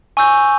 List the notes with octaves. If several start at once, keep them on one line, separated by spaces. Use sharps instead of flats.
G#5 C#6 E6 G6